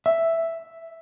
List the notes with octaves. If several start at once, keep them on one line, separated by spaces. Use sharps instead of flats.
E5